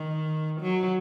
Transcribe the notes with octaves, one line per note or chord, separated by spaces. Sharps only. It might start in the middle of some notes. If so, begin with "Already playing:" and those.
Already playing: D#3
F#3